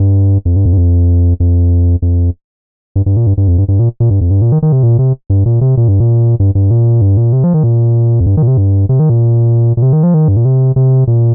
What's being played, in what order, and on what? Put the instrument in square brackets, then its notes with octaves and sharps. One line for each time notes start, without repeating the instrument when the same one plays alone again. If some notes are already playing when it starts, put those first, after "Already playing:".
Already playing: [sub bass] G2
F2
G2
F2
G2
F2
F2
F2
G2
G2
A#2
G2
G2
F2
G2
G2
A#2
A#2
G2
F2
G2
A#2
D#3
D#3
C3
A#2
C3
G2
A#2
C3
A#2
G2
A#2
G2
G2
A#2
G2
A#2
C3
F3
D#3
A#2
F2
G2
D#3
A#2
C3
G2
C3
D#3
A#2
A#2
C3
D#3
F3
D#3
G2
A#2
C3
C3
A#2